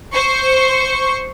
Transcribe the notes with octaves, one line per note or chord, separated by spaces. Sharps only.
C5 C#6